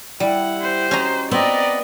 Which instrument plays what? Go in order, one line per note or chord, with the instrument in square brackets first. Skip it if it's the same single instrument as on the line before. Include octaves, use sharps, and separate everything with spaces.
[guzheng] G3 [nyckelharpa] E4 F#5
[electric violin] G4 C5
[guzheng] C#4 D#5 A#5 [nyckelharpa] F#4
[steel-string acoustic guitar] B3 [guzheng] C4 [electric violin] D5 D#5 [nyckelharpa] A#5